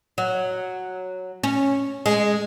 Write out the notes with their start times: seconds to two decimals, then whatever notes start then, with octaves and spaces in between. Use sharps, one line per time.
0.18 F#3
1.44 C#4
2.06 G#3